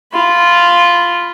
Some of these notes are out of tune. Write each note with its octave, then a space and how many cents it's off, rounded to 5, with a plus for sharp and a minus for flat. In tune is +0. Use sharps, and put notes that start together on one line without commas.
F4 -5 B5 +0